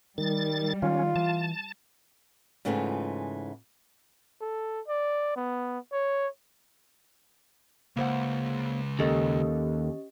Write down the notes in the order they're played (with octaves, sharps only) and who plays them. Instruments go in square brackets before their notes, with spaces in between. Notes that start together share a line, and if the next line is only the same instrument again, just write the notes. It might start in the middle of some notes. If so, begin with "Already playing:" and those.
[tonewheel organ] D#3 A6 [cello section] G3
[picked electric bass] D#3 [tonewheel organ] C#4 [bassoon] F4
[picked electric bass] E3 [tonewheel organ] A5
[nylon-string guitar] G#2 C#3 E3 A3 C4 F4
[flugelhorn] A4
D5
B3
C#5
[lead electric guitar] C#2 [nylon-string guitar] A#3 C5 F#5
[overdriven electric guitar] D#2 [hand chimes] C#4 G4 D#5 [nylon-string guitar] A4 A#4